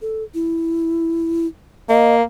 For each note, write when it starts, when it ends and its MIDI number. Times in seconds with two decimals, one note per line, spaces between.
0.02 0.23 69
0.34 1.47 64
1.89 2.23 58
1.89 2.15 75